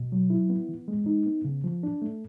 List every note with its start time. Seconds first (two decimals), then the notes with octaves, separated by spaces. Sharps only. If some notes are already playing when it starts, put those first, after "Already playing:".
Already playing: B2
0.12 F#3
0.30 E4
0.50 B3
0.69 E3
0.88 G#3
1.06 D#4
1.26 B3
1.45 C#3
1.64 F3
1.83 D4
2.02 A3